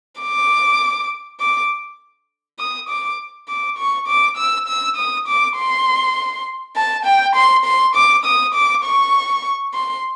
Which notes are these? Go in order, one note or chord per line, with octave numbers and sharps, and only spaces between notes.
D6
D6
D#6
D6
D6
C#6
D6
E6
E6
D#6
D6
C6
A5
G5
C6
C6
D6
D#6
D6
C#6
C6